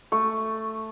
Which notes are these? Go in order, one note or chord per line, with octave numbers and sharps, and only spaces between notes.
A3 C#6